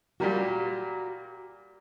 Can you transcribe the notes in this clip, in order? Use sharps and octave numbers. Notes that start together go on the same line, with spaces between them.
A#2 G3 A#3 F#4